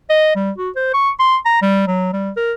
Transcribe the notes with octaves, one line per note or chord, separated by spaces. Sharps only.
D#5
G3
F#4
C5
C#6
C6
A#5
G3
F#3
G3
A#4